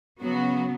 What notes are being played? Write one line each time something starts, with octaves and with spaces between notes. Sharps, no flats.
C#3 F#3 B3 F#4